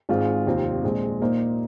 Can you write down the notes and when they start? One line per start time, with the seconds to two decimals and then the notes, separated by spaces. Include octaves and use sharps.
0.09 G#1 G#2 G#3 F4
0.46 F1 D#2 D#3 C4 F4
0.83 A#1 A#2 G#3 C4
1.21 A#2 A#3 D#4 C5